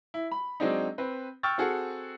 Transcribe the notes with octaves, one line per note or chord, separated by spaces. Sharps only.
E4
B5
F#3 G#3 C4 D4 D#4
C4 B4
G5 C#6 E6 F6 A6
C4 F#4 G#4 A4